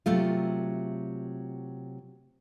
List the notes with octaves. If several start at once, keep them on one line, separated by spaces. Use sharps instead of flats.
C3 F#3 A3 F4